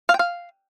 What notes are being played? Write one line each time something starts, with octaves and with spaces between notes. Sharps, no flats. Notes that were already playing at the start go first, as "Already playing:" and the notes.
F5
G5
F5